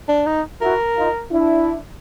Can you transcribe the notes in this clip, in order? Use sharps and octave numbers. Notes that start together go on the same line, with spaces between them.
D4
D#4
E4 F#4 A#4
D#4 F4
D4 E4